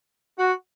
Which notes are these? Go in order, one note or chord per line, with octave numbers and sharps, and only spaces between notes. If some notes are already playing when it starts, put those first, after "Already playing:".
F#4